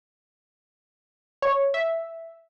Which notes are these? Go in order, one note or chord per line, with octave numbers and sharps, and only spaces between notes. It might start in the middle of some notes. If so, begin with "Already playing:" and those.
C#5
E5